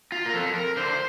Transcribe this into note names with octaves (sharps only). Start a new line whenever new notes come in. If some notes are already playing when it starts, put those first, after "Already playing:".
F4
A#4
F3 C4 A4
A#4
D3 C5